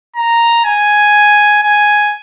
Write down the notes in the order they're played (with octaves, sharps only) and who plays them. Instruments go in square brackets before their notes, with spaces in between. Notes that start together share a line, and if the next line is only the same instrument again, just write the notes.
[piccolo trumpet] A#5
G#5
G#5